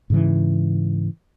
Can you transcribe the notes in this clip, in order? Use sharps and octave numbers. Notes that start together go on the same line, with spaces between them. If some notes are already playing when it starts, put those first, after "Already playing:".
G#2 C#3 E3